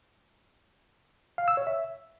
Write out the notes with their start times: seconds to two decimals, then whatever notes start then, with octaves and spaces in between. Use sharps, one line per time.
1.38 F5
1.48 E6
1.57 C#5
1.67 E5